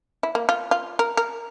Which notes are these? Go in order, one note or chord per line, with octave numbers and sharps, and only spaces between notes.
E4
A#3
F4
F4
A#4
A#4